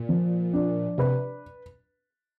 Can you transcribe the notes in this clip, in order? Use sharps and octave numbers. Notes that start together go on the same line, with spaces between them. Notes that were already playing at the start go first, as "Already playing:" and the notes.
Already playing: A#2
F3
D4
C3 B4